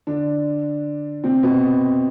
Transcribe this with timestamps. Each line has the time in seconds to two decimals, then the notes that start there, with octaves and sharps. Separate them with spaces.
0.07 D3 D4
1.24 C3 C4
1.43 B2 B3